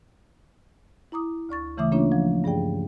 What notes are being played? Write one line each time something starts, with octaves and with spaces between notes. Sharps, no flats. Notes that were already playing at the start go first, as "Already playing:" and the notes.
E4 A#5 D6 D#6
D2 D5 C#6 A6
C#3 E3 A3 E5 D6 D#6
A#3 C#4 D4 F4 C#5
F3
G2 G#4 D5 G5